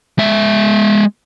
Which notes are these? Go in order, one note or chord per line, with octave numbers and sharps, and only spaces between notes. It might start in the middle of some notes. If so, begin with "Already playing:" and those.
G#3 E5